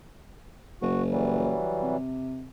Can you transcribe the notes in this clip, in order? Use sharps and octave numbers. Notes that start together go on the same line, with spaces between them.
F#1 F#4
E3 F#3 G3
C3